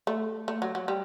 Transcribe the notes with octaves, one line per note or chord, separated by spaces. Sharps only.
A3
A3
F#3
F#3
G3